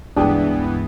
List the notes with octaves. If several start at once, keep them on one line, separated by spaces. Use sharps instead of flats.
C#2 G2 E3 G#3 B3 D4 G5 D#6